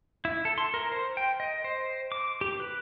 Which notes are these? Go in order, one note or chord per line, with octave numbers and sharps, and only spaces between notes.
E4
A4
C6
A#4
C5
G5
D#5
C5
D6
G4
B4